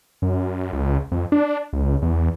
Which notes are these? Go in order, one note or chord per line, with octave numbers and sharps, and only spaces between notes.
F#2
C#2
F2
D4
C#2
E2